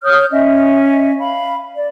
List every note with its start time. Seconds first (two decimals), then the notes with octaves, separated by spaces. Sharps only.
0.03 C#5 D#6 F6 G6
0.32 C#4 D#5 E5
1.18 F5 B5
1.76 D5